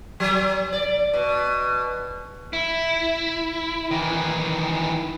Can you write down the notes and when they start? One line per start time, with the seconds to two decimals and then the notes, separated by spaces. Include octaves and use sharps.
0.20 F#3
0.73 D5
1.13 B2
2.53 E4
3.91 D#3 E3